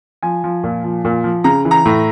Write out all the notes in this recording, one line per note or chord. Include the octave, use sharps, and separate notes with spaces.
F3 G#5
F3
A#2
F3
A#2
F3
C#3 A#5
E3
A#5
A2